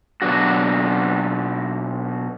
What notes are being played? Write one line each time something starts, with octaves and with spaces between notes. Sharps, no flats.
B2 F#3 D4 F#4